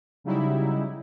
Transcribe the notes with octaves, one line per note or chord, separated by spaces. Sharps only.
C#3 F#3 G3 D#4 E4